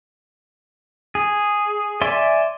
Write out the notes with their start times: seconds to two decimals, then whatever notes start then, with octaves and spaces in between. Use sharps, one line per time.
1.15 G#4
2.02 D5 E5 G#5 C6